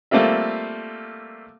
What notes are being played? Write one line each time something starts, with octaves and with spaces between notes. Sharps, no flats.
G3 A3 A#3 C4 F4 E5